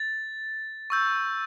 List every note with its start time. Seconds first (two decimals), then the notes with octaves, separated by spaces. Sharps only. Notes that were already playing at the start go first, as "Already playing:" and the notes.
Already playing: A6
0.90 C#6 E6 G6